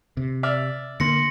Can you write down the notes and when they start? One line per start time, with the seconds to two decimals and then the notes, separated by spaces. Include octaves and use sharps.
0.17 C3
0.43 D5 E5 F6
1.00 D3 A#3 C6 A#6 C#7